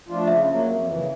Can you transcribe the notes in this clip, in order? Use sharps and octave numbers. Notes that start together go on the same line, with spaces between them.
F3 A3 D4 F4
C#3 E5
F#3 A#3
F2
C#3 E3